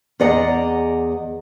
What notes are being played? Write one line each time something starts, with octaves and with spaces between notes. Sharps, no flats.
E2 G#4 D5 D#5 F#5 A#5